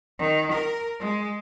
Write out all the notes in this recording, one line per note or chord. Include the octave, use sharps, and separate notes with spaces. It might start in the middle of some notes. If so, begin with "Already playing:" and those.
D#3
A#4
G#3